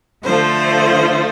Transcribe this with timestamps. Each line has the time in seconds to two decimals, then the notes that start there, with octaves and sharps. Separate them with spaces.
0.24 D3 F3 A3 C5